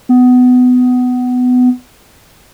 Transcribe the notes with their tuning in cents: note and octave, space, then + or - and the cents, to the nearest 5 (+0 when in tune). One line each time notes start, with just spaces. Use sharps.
B3 +20